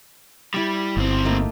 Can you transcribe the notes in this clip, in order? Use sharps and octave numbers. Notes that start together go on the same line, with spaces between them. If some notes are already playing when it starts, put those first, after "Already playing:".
G3 E4 B5
G1 G#2 C4
A3 A#3 D#4